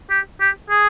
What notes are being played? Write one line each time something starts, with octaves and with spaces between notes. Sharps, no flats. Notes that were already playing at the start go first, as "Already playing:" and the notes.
G4
G4
G#4